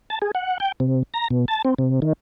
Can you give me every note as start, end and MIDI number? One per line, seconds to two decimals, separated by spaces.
0.10 0.19 81
0.22 0.31 68
0.35 0.58 78
0.60 0.72 79
0.80 1.03 48
1.14 1.28 82
1.30 1.45 47
1.48 1.62 81
1.65 1.74 60
1.79 2.00 48
2.02 2.13 51